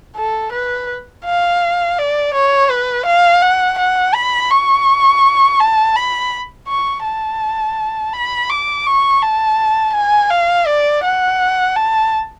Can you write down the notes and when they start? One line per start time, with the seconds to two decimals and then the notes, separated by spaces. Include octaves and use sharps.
0.16 A4
0.53 B4
1.26 F5
1.98 D5
2.34 C#5
2.70 B4
3.06 F5
3.42 F#5
3.79 F#5
4.15 B5
4.51 C#6
5.60 A5
5.96 B5
6.68 C#6
7.05 A5
8.13 B5
8.50 D6
8.86 C#6
9.22 A5
9.95 G#5
10.31 F5
10.67 D5
11.04 F#5
11.76 A5